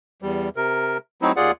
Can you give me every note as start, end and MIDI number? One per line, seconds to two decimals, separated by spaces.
0.22 0.49 40
0.22 0.49 55
0.56 0.98 48
0.56 0.98 70
1.22 1.32 54
1.22 1.32 57
1.22 1.32 60
1.22 1.32 63
1.22 1.32 64
1.36 1.51 39
1.36 1.51 65
1.36 1.51 68
1.36 1.51 74
1.36 1.51 78